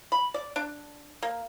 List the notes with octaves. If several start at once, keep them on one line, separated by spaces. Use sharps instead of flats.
B5
D5
D4
A#3